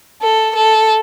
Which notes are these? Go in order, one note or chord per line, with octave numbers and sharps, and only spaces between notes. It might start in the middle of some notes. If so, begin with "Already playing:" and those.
A4
A4